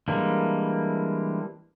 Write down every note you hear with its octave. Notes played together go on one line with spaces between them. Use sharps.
E3 G3 G#3 A#3 D4